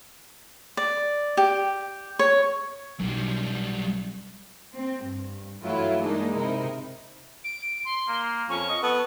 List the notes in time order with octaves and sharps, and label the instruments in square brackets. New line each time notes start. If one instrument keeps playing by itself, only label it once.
[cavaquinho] D5
G4
C#5
[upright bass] B1 [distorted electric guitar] F#2 G3
[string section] C4
G2
G2 E3 F#3 A3 E4 F4
G#3 A#3 D4 D#4
C3 D#4 E4 A#4
[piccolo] D7
C6
[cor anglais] A#3
[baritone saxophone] F2 [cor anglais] C#4 [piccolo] C#6
[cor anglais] D#5
[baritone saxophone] B3 [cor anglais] A4